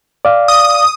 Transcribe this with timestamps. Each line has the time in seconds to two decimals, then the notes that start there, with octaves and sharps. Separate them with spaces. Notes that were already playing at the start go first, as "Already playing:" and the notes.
0.25 D5 F5
0.48 D#6